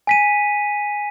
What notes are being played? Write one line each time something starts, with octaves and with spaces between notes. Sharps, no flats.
G#5 B6 D#7